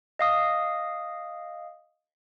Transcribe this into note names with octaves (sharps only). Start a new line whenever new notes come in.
D#5 F5 D#6